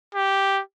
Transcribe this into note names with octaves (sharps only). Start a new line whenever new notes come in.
G4